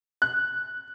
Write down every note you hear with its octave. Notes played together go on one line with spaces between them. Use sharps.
F#6